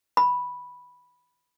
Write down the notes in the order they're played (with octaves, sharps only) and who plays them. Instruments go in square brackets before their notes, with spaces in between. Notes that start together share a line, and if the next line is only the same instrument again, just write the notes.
[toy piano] B5